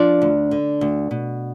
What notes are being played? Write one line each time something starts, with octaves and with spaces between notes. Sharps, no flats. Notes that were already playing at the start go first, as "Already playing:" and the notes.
Already playing: F3 D4 D5
D2
D3
D2
B2